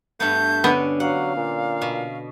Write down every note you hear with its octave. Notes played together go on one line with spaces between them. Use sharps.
G2 A3 B3 G6
D3 B3 C#4
F#3 F5 F#5
A#2
B2